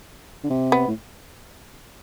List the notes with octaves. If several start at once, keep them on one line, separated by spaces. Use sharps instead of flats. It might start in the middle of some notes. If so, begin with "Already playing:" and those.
D3
C3
B3
A2